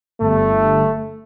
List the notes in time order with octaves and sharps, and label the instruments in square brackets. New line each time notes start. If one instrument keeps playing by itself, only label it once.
[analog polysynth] G1 [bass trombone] A3